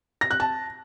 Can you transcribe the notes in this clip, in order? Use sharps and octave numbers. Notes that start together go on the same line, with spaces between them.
A#6
F#6
A5